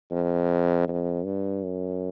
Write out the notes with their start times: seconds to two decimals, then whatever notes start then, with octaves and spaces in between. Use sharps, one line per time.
0.11 F2
0.88 F2
1.25 G2
1.63 F#2